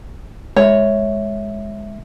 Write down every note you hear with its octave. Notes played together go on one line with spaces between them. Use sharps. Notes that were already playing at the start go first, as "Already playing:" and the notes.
G#3 C#5 E5